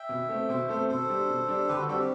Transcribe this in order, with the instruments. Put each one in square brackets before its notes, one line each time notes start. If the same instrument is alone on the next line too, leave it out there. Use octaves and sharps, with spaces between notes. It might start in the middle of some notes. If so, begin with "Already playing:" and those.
Already playing: [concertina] E5 G5
[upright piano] B2
A3 C4
[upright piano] B2 [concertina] C5 E5
[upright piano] A3 C4 [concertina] A4 C5
[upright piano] B2 [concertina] A4 C5
[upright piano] G3 D4
B2
G3 D4
[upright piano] D3 [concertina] G4 B4
[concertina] F#4 A4
[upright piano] G3 C4 [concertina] F#4 A4
[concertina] G4